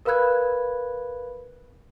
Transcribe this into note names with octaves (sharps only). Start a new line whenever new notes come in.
A#4 B4 F5 B5 F#6 G#6